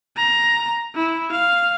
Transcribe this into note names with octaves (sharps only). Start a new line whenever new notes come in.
A#5
E4
F5